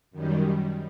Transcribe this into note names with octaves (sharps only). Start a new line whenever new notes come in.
F#2 D#3 G3